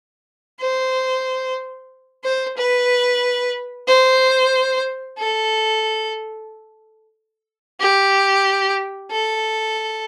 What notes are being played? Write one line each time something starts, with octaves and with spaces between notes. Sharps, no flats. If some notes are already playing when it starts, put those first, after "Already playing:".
C5
C5
B4
C5
A4
G4
A4